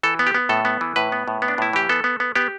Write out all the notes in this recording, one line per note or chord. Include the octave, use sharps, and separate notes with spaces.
E3 A4
B3
G4
B3
A2 A4
B3
E3
A2 B4
B3
A2
B3
D4
A2 E4
E3 G4
B3 A4
B3
B3
B3 G4